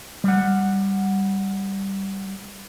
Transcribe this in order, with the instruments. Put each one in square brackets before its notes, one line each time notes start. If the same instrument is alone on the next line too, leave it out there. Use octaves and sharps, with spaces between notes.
[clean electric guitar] G3 F#5